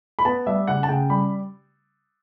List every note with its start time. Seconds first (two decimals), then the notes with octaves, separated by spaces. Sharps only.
0.19 B5
0.25 B3 A5
0.46 G3 E5
0.67 C#3 F#5
0.83 A5
0.88 C#3 G5
1.09 G3 B5